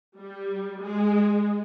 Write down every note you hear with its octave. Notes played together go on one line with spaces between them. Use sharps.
G3
G#3